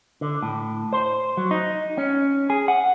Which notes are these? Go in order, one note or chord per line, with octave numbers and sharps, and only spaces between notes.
D3
A2
C5
F#3
D#4
C#4
G#4
F#5